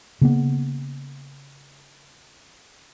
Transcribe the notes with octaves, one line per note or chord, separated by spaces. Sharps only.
C#3 A#3 B3